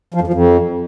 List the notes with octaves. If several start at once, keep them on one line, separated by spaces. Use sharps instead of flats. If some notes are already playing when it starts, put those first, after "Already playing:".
F3
F2
F3
F2